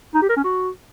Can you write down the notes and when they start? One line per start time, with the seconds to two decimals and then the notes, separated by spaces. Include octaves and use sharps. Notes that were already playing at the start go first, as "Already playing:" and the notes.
0.15 D#4
0.22 G4
0.29 A#4
0.37 C#4
0.44 F#4